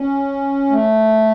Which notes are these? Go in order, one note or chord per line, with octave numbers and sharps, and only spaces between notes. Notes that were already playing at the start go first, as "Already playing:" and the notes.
Already playing: C#4
A3